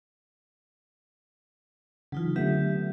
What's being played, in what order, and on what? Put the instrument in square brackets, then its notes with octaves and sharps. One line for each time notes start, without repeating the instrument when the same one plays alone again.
[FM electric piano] C#3 E3 [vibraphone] F#3 D#4 F4
[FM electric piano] D3 A3 B3 [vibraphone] F#3 G4 E5